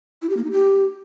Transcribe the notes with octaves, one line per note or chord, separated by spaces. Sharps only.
E4
G4
A#3
D#4
G4